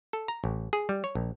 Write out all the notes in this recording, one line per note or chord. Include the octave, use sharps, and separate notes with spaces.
A4
A#5
A1
G#4
G3
C#5
A#1